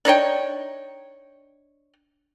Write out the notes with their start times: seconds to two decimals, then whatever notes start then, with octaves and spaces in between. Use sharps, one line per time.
0.05 D4 D#4 C#5 G5